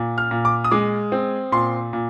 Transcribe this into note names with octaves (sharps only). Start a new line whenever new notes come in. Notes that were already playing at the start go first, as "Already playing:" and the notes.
Already playing: A#2
F6
A#2
D6
D#6
G#3 D6
C4
A#2 C6
A#2